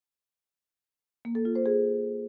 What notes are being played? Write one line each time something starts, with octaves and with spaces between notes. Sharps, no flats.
A#3
A4
F4
C5
G#4